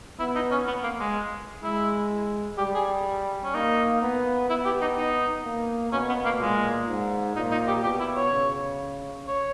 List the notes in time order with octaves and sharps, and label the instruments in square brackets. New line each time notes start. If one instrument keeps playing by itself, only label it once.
[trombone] B3 [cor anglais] E4
[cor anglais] D#4
C#4
B3
A#3
G#3
[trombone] G#3 [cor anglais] E4
[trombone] G3 [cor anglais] G4
[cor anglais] G#4
C#4
[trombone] A#3 [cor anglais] D#4
[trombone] B3
[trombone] B3 [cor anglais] E4
[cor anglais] G4
D#4
D#4
[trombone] A#3
[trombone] B2 [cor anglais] C#4
[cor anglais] B3
A#3
[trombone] A#2 [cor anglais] G#3
[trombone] G#2
[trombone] A#2 [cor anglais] D#4
[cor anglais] D#4
G4
[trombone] B2 [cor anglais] G4
[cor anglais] E4
C#5
[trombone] C#3
[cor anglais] C#5